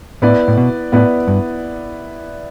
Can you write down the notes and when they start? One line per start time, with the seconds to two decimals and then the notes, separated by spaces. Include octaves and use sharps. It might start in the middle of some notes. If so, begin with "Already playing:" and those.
0.22 A2 B3 E4 B4 D5
0.48 A2
0.57 B2
0.92 A2 B3 E4 B4 D5
1.28 G2